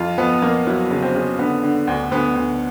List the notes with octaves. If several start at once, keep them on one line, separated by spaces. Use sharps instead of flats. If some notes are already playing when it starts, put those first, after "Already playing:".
Already playing: F2 F4
F2 B3
F2 A#3
F#3 E4
C#3
C4
C#3
D3 B3
D3
D2
D2 B3
D2